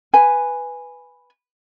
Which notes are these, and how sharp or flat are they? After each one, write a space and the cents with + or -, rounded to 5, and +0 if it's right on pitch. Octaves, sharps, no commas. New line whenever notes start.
B4 +0 G#5 -5